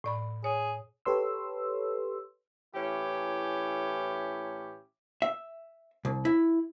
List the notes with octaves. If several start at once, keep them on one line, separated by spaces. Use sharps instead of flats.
A2 D5 B5
G#4 C#5
G4 A4 B4 C#5 C6 E6
A2 E3 C#4 E4 G4
E5
C2
E4